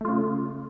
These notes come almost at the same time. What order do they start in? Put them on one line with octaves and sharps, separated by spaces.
A3 F4 C#3